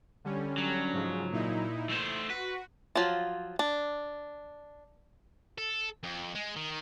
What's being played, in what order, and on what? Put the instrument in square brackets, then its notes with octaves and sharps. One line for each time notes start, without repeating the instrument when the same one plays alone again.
[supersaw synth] D3 G3 C#4
[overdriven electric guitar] F#3
[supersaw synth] G#2 C#3 F3
A#2 D#4 E4
[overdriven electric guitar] A3 C5 [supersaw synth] C6
[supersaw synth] F#4 [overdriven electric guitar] B4
[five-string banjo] F3 F#3 F4
D4
[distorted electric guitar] A4
F2
G#3
D#3